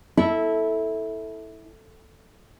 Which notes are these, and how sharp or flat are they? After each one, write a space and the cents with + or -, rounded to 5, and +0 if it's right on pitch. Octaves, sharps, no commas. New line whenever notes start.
E4 -15 A4 +0